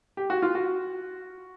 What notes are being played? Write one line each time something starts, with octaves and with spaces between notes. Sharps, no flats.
G4
F#4
F4
F#4